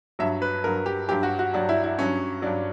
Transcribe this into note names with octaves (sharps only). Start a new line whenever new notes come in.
G2 F#3 E5
B4
G2 F#3 A#4
G4
G2 F#3 G4
F#4
F#4
G2 F#3 D4
E4
E4
G2 F#3 C#4
G2 F#3 D4